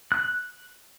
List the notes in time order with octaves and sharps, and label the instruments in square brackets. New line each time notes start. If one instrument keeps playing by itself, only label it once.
[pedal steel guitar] F#6